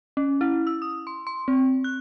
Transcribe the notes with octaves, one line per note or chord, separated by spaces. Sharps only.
C#4
E4
E6
D#6
C6
C6
C4
F#6